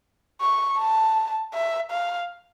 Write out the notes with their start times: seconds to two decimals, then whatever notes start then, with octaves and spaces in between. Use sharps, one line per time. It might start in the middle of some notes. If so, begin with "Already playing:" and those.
0.40 C#6
0.79 A5
1.54 E5
1.91 F5